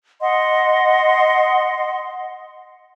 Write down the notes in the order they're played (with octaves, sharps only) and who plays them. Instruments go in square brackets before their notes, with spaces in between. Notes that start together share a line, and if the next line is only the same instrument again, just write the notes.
[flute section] D#5 F#5 C6